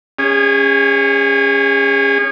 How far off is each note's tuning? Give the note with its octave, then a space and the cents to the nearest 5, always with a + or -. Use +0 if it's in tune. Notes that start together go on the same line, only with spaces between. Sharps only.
C#4 +0 G#4 -35